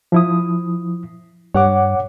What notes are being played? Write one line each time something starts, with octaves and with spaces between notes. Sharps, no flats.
F3 E4 D#6
G2 C#5 F#5 D6